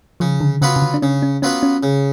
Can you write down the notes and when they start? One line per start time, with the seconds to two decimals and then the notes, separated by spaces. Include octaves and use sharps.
0.20 C#3 F3
0.41 D3
0.62 C#3 F#3 B3 F4 B4
0.76 C#3
0.82 D3
0.94 D4
1.02 C#3 C#4
1.23 C#4
1.42 F#3 B3 C#4 F4 B4
1.63 C#4
1.83 C#3